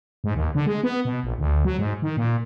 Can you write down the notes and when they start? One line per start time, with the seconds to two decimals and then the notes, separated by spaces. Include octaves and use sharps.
0.24 G#2
0.35 D#2
0.55 D3
0.66 G#3
0.83 B3
1.05 B2
1.23 A#1
1.39 D2
1.65 F#3
1.79 G#2
2.02 D#3
2.17 A#2